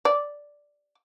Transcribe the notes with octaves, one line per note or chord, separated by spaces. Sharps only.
D5